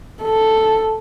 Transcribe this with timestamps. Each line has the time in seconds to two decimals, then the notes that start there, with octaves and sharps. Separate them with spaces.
0.23 A4